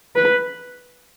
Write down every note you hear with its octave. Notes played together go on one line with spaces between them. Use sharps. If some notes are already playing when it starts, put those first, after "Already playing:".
B4